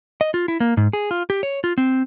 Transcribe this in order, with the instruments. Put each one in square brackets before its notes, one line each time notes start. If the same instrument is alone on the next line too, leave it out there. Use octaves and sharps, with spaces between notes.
[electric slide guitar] D#5
F4
E4
A#3
G#2
G#4
F4
G4
C#5
F4
C4